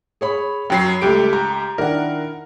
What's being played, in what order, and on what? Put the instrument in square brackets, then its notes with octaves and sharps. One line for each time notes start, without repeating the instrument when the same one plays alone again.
[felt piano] G#4 C#5 B5
[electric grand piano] F#2 F#3 C7 [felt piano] G5 B5
[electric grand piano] C#2 G4 D7 [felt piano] G3 A3
[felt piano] A#5
[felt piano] D#3 D4 E4 [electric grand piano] A#4 F#5